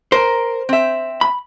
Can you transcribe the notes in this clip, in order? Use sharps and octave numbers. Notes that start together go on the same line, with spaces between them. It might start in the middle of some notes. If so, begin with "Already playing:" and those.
A#4 C5
C4 E5
B5